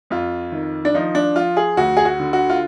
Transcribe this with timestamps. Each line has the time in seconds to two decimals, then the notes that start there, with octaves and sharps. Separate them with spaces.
0.10 F2 F4
0.52 D#3
0.85 D4
0.94 F3 D#4
1.15 D4
1.36 F3 F4
1.57 G#4
1.77 D2 F#4
1.97 G#4
2.05 F#4
2.20 D3
2.33 F#4
2.50 F4